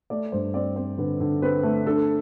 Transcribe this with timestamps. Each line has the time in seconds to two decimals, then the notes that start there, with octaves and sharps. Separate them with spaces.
0.10 A3 D5
0.32 G2 C5
0.54 C4 D5
0.76 C4 C5
0.98 D3 B4
1.20 D3
1.42 C4 B4
1.63 A3
1.86 D4 A4